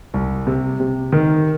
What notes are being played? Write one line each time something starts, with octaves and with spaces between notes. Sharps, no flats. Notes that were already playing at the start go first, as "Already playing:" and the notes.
C2
C3
C3
D#3